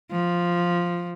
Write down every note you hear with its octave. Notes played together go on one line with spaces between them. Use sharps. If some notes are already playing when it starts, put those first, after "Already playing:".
F3